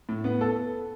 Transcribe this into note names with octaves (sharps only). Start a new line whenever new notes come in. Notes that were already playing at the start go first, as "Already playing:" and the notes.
A2
B3
A4